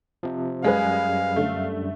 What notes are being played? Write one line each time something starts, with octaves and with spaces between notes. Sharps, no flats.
C3 F3
F#2 G3 G#3 G#4 B4 F5
D3 A3